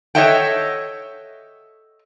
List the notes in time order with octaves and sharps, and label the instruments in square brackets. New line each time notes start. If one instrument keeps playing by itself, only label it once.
[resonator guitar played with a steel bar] A4 C#5 D#5 E5 F#5 G5